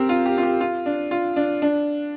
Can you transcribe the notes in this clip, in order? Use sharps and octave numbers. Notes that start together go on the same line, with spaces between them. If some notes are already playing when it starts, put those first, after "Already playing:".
Already playing: C4 G4 A#4
F4
G4
F4
G4
F4
D4
F4
D4
D4